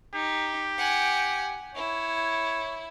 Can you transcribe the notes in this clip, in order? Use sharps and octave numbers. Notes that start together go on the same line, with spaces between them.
D#4 G4
F#5 G#5
E4 C#5